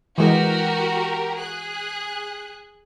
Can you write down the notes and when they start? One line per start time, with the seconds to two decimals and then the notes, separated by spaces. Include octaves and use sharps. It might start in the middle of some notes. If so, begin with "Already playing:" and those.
0.18 E3 G#3 F#4 G4 A#4
1.36 G#4 F#6